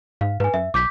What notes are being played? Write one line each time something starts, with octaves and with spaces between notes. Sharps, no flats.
G#2 F5
G#2 B4 G#5
F#2 E5
B1 D6 G6 B6